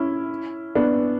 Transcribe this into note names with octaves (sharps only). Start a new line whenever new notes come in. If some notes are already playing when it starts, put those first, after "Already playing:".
Already playing: C#4 E4
B3 D4